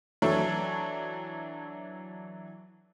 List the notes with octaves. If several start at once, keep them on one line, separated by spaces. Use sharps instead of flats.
E3 F#3 D4 E4 A4 C#5